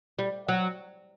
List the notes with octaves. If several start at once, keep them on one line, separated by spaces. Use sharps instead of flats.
G3
F#3